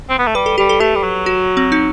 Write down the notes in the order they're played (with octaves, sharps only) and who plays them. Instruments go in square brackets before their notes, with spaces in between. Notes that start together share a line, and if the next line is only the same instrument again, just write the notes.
[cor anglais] C4
B3
A3
[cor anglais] G3 [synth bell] B4
[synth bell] A4
[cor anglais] G3 [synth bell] G4
[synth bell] A4
[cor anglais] A3 [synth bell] G4
[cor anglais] G3
F#3
[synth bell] F#4
C4
D#4